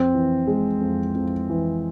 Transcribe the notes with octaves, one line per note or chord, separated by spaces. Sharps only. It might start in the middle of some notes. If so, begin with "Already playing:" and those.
Already playing: F2 C4
E3
G#3
F2
F2
E3